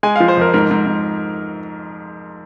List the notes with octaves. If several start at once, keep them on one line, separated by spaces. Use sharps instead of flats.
G#3 G#5
F3 F5
C5
F2 A#4
G#2 A#4
G#2
G#2